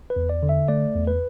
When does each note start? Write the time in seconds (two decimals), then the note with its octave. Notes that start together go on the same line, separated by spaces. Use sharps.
0.10 B4
0.16 E2
0.29 D5
0.43 D3
0.49 E5
0.68 A3 D5
0.95 E2
1.07 B4